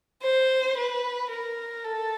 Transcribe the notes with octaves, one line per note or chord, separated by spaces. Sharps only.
C5
B4
A#4
A4